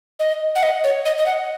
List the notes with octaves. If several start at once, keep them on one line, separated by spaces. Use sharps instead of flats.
D#5
F#5
D#5
C#5
D#5
D#5
F#5